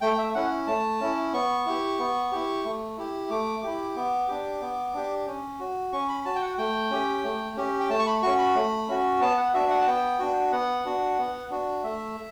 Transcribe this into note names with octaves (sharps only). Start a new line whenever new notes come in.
A3 G5
E5
C#4 E4 F#5
A3 A5
C#4 E4
B3 C#6
E4 G4
B3
E4 G4
A3
E4 G4
A3 D6
E4 G4
B3
D4 G4
B3
D4 G4
C#4
F#4
C#4 C#6
B5
F#4 A5
G5
F#5
A3 G5
C#4 G4
A3
C#4 G4
G5
A3 A5
C#6
B5
C#4 F#4 C#6
B5
A3
C#4 F#4
B3 A5
F#5
D4 F#4 E5
F#5
A5
B3 G5
D4 F#4
B3 F#5
D4 F#4
B3
D4 F#4
A3 E5